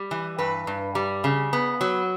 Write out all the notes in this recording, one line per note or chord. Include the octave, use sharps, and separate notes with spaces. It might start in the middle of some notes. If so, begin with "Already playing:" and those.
Already playing: G3
E3
G2 B4
G2
G3
C#3
B3
F#3